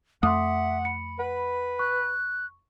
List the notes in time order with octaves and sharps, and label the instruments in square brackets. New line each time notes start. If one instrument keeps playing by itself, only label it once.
[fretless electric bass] F2 A3 [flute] E5 [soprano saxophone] F#5 [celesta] C6 D6 D#6
[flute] B5 [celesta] C#7
[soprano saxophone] B4 [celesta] F#5
[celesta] C#6 [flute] F#6